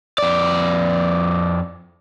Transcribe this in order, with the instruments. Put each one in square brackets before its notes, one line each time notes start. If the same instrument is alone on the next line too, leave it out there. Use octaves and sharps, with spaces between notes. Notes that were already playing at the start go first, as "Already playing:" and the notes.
[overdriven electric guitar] F2 D5